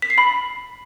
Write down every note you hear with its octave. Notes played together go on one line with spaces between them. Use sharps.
B6
C7
B5